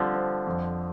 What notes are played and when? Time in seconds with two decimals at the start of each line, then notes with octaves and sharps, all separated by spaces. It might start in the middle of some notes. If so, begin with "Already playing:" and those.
Already playing: D3 F3 G3 C4
0.15 C4
0.47 F2